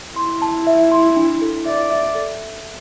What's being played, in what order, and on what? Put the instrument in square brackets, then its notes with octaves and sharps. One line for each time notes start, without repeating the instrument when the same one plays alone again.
[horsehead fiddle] E4 [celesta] C6
[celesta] A5
E5
C6
D4
A4
[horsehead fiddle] D5 [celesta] E5
[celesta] E5
A4